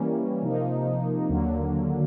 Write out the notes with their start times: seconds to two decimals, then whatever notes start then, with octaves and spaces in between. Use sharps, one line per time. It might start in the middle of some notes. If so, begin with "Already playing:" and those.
Already playing: E3 G3 A#3 C#4
0.43 C3 F3 A#3 D#4
1.29 D#2 D3 F#3 A#3